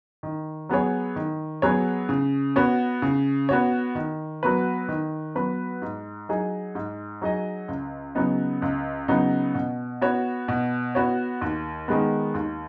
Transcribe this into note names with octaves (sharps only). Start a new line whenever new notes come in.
D#3
F#3 B3 G#4 C#5
D#3
F#3 B3 G#4 C#5
C#3
B3 F#4 C#5
C#3
B3 F#4 C#5
D#3
F#3 B3 F#4 B4
D#3
F#3 B3 F#4 B4
G#2
F#3 D#4 G#4 D#5
G#2
F#3 D#4 G#4 D#5
C#2
C#3 F#3 B3 D#4
C#2
C#3 F#3 B3 D#4
B2
B3 F#4 C#5
B2
B3 F#4 C#5
D#2
D#3 G#3 B3
D#2